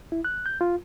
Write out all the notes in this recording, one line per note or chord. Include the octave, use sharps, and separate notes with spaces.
E4
F#6
G6
F4